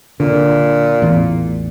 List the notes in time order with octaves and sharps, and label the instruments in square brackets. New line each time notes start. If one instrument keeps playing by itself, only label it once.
[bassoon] A#2 [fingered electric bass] D3
[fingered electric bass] A1 E2